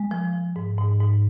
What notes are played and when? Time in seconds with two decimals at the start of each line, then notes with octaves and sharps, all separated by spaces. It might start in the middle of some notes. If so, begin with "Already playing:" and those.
Already playing: G#3
0.11 F3
0.33 F3
0.56 G#2
0.78 G#2
1.00 G#2